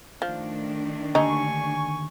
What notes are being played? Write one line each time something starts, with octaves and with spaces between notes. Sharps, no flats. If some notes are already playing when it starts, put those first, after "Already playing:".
D#3 F3 A3 D4
D#2 D3 D#4 G#5 C#6